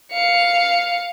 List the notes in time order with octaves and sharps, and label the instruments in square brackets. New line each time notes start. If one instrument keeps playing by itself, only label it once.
[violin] F5 C#7